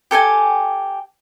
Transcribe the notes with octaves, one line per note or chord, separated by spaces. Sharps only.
G4 A4 G5 G#5